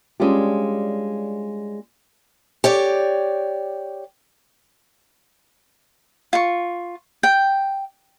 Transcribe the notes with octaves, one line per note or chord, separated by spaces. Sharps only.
G3 G#3 C#4 D4 F4 G4
G4 C#5 D5
F4 C#6
G5